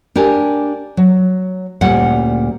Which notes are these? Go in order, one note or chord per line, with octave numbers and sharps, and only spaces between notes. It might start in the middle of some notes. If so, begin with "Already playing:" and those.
D4 G4 A#4 G#5
F#3
D2 A#2 G3 C#4 F#5